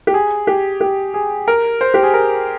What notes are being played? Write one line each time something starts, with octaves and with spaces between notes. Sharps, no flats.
G4
G#4
G4
G4
G#4
A#4
C5
G4
G#4
A#4